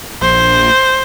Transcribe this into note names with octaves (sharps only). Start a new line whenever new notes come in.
A#1 C5